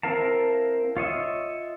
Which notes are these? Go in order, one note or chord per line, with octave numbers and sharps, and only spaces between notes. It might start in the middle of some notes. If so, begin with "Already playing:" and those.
C4 E4 A#4 F5 A5
F4 C#5 D#5 E5